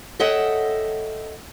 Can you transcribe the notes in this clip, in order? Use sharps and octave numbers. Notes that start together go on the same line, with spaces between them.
A4 C#5 D#5 E5 F#5 G5